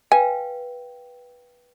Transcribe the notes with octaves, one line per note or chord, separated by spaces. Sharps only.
B4 F5 G5 G#5